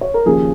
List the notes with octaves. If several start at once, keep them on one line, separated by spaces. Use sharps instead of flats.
C#5
A#4
D#2 C#3 F3 G#4